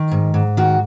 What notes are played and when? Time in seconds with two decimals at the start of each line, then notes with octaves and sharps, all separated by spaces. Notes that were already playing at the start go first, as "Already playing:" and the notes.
Already playing: D#3
0.11 G#2
0.34 G#2
0.57 D#3 F#4